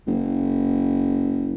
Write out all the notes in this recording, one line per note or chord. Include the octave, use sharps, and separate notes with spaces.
F#1